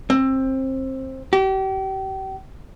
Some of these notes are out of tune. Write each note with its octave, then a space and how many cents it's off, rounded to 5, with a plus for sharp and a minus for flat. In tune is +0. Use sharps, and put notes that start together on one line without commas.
C4 +20
G4 -35